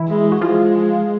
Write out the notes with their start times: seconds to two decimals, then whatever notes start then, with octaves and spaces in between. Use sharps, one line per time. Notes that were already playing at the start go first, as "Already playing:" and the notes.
Already playing: E3 E4
0.08 G#3
0.32 F#4
0.41 F3 G#3 F4